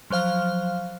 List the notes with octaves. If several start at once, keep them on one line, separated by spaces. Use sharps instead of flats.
F3 F#3 C5 F5 F6